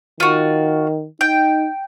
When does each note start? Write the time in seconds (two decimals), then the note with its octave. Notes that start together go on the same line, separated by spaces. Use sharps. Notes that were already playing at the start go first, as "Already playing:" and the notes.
0.20 D#3 F4 F#4
1.21 D#4 G5